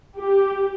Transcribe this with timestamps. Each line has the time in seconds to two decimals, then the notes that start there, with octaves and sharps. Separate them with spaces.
0.17 G4